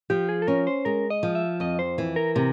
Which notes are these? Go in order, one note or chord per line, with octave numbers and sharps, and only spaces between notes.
F3 G4
G#4
A4
C#4 A#4
C5
G#3 A#4
D#5
F3
E5
F2 D#5
C5
E3
A#4
C3 A#4